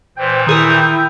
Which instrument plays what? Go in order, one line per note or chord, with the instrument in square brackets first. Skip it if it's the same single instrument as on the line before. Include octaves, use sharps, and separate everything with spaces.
[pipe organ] A#2 E3 [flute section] C5 [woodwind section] G5
[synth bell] D#3 G#4 A#4 [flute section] E4 E6 G6